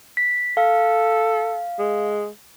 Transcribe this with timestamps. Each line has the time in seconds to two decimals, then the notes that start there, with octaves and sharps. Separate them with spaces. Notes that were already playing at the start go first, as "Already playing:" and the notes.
0.17 B6
0.57 A4 F5
1.79 G#3